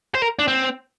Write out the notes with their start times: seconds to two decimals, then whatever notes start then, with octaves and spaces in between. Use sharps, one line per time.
0.15 C5
0.22 A#4
0.39 D4
0.48 C4